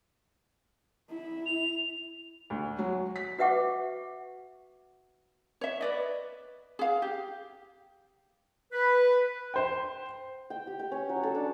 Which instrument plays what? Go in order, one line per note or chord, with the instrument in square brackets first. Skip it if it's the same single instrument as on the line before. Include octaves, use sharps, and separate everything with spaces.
[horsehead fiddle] E4
[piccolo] F7
[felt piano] D2
F#3
B6
[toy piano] F#4 B4 E5 F#5 C#6 D6
[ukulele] C#5 E5
B4 D5 D#5
G#4 F5
G4
[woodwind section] B4
[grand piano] C5 G5
[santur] G5
G4
G5
C#4
F#3
A4
D4